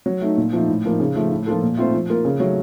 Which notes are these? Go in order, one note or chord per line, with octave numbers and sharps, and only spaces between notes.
F#3
A3 D#4
A#2
F3 A3 D#4
A2
F3 A#3 D#4
C#3
F3 A3
A2
F3 A#3 F4 A4
A#2
A3 C4 F4 C5
F3
A#3 F4 A#4
C#3
F#3 A3 C#4